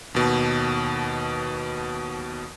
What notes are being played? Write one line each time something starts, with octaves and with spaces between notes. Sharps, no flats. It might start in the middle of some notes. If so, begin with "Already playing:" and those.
D#2 B2